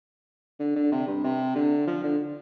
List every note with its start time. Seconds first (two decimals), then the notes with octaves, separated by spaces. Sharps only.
0.59 D3
0.75 D3
0.92 C3
1.07 G2
1.24 C3
1.55 D3
1.87 F3
2.03 D3